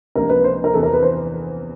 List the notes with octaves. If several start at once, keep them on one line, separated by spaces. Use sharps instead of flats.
C#2 C3 F3 A#3 D4 A#4
B4
C5
A#4
E2 C3 E3 A4
A#4
B4
C5